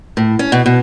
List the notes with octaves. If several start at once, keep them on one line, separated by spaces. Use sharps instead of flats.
A2
C#4
B2
B2